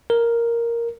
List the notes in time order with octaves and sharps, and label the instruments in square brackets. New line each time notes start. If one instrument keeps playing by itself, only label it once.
[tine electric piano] A#4